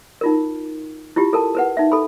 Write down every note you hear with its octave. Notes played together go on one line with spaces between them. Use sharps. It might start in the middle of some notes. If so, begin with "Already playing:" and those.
D#4 F4 A#4
E4 F4 G4
A4 A#4 A5
A#4 B4 F#5
D#4 E5
A4 B5